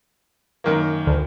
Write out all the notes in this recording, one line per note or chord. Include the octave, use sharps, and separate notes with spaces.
F#2 D#3 A#3
D2